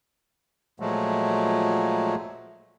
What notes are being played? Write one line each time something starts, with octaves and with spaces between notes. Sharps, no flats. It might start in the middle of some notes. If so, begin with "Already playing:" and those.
A#2 F3 F#3 G#3 A3